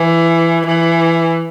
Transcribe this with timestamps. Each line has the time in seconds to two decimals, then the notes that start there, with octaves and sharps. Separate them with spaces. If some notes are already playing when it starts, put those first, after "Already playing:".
Already playing: E3
0.66 E3